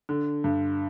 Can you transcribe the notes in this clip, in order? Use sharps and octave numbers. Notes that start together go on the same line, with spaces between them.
D3
G2